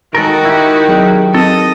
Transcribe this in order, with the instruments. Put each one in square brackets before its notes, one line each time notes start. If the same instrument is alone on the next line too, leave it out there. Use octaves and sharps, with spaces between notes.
[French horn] D#3 [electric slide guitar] G#3 A4 A#4 [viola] D#4 F#4
[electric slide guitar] E4 G4
[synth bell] F#3 G#4
[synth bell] C4 [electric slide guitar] A4 [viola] D#5